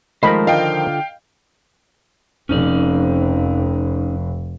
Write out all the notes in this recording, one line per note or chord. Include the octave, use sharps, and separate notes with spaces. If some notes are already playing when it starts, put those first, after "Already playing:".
D#3 F3 G#3 A3 A#4 C5 D#5 B5
D3 F4 D#5 F5 G5
F1 F2 C#4 D#4 D5